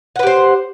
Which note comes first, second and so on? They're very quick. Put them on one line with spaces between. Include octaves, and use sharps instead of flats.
F#5 B4 G4 C5